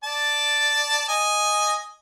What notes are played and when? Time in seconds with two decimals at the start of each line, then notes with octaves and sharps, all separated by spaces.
0.04 D5 A5
1.09 D#5 G#5